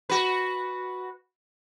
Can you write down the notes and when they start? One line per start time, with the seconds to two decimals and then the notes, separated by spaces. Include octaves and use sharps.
0.10 F#4 B4